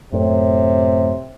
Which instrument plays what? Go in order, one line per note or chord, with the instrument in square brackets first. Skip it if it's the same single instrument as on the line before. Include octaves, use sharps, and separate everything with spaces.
[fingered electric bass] F#2 A2 [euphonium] C3